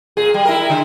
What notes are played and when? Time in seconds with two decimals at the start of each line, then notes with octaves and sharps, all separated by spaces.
0.17 A#2 G#4
0.34 G3
0.45 E4 A#4
0.70 D3